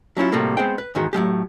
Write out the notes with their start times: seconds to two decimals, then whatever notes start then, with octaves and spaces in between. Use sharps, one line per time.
0.17 F#3 C#4 E4 F4
0.32 A2 C3 G3 A3 A#3 F#4
0.57 G#3 B3 C4 G#4 C5 G5
0.78 B4
0.95 E2 G#2 D#3 G#3 F#4
1.13 A2 F#3 G#3 G4